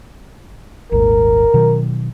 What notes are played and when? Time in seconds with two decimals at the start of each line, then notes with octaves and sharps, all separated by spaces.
0.92 D#1 G#1 D#2 A#4
1.54 B2 D#3 F#3